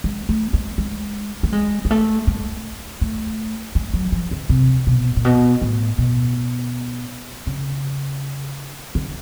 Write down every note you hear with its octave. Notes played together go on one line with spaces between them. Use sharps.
G#3
A3
G#3
G#3
A3
G#3
G#3
A3
G#3
A3
G#3
F#3
F3
D3
C3
B2
A#2
B2
A2
B2
C#3
D3